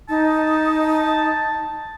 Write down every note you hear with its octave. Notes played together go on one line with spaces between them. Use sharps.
D#4 A5